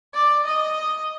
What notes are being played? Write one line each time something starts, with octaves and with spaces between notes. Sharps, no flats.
D5
D#5